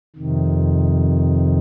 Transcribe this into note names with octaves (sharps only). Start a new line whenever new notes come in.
F2 C3 D#3